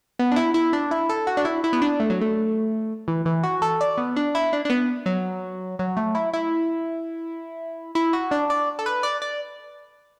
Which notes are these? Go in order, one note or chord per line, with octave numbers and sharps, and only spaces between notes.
B3
D4
E4
E4
D4
E4
A4
F#4
D4
E4
E4
B3
D4
A3
F#3
A3
E3
E3
F#4
A4
D5
B3
D4
E4
D4
D4
B3
F#3
F#3
A3
E4
E4
E4
F#4
D4
D5
A4
B4
D5
D5